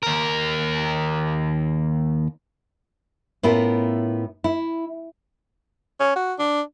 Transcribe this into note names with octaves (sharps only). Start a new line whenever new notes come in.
D#2 A#4
A2 B3 C#4 E4 F4 A#4
E4
C#4
F#4
D4